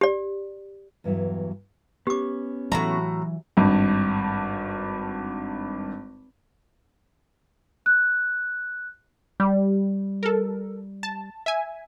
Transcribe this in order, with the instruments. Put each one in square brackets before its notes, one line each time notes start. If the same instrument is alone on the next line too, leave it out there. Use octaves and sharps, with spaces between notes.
[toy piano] G4 D5
[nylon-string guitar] E2 G2 E3 F#3
[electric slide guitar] B3 C#4 [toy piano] G4 D6
[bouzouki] A2 F#4 A#5 [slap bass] E3 F#3
[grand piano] G#1 G2
[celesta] F#6
[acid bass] G3
[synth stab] A4 A#4
A5
E5 G#5